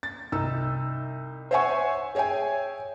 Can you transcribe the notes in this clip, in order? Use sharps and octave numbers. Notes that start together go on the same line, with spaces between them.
A6
C2 D#4 E6
C5 C#5 E5 F#5 G#5 C#6
G#4 C#5 E5 G5 G#5